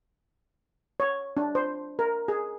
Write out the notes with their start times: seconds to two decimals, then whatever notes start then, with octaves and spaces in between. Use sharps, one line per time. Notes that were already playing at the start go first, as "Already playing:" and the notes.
1.00 C#5
1.37 D4
1.55 C5
1.99 A#4
2.28 G#4